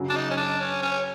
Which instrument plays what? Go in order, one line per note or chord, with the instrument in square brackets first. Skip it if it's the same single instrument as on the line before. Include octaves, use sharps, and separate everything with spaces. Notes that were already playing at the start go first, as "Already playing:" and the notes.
Already playing: [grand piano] F#2 C#3 F#3
[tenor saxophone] D4
D#4
C#4
D4
C#4
C#4